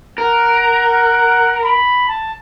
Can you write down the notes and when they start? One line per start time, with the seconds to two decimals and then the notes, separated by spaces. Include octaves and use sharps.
0.18 A#4 F#5
0.88 F#5
1.64 B5
2.09 A5